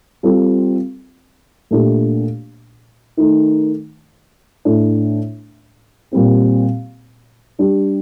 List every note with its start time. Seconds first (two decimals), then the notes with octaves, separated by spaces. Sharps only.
0.23 G3 C4 F4 A4
1.71 A#2 A3 D4 G4
3.17 D#3 A3 D#4
4.65 A2 A3 D4
6.12 A#2 G3 C4 G4
7.59 G3 D4 G4